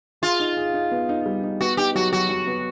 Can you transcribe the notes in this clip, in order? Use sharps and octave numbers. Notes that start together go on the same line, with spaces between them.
F4 G#4
D#4
G#4
D#4
B3
D#4
G3
D#4
B3 F#4
D#4 G4
F#3 F#4
F#3 F#4
F#3
B3